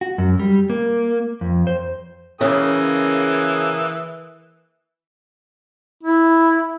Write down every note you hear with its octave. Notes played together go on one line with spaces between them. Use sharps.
F#4
F#2
G3
A#3
F2
C5
C#3 E3 A#3 G#5 D#6
E4